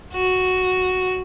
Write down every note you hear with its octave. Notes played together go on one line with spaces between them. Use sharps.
F#4